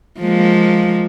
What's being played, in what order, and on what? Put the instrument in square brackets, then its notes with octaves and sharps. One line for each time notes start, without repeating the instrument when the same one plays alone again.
[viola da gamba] F3 G#3 A#3